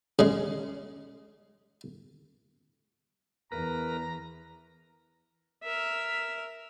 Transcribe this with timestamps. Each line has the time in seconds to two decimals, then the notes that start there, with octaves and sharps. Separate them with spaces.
0.19 C#3 G#3
3.52 E2 A#4 B4 A#5
5.64 A#4 E5